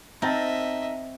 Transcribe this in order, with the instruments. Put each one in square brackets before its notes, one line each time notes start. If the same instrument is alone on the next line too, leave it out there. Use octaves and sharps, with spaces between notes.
[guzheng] C4 [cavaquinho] D#4 A#4 A5 [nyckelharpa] D#5 E5